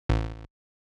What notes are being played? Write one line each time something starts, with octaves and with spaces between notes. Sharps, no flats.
A1